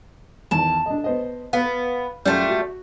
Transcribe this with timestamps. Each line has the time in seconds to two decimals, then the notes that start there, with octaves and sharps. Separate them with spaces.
0.51 E2 D#3 A5
0.86 D4 D#5
1.04 B3 C5 D#5
1.53 B3 F5
2.25 F#2 G3 A3 F4
2.49 F#4